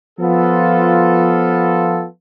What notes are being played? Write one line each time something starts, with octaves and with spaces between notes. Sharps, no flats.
F3 B3 F4 A4